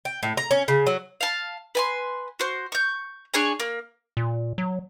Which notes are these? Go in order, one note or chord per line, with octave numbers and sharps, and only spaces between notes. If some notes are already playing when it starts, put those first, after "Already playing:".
G5
A2
A#5
C#4
C#3
F#3
F5 A5
B4 G#5 C6
F#4 C5
C#6 G6
D4 G#4 C#5 G#5
A#3
A#2
F#3